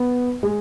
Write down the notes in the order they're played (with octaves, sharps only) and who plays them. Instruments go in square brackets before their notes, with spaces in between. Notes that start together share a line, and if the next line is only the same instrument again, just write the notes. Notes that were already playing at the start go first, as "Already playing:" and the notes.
Already playing: [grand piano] B3
G#3